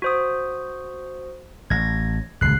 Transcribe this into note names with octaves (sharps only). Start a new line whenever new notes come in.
F#4 C5 D#6
A1 G#6 A#6
D#1 C#2 F#6 C7